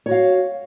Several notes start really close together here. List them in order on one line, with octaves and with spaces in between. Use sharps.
C#5 F#4 F5